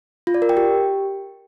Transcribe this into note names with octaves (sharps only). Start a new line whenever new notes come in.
F4
D5
A#4
G5
G4